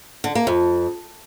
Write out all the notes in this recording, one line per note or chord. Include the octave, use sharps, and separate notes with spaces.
D3
A#3
F2